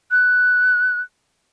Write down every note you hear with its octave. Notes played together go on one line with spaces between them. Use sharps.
F#6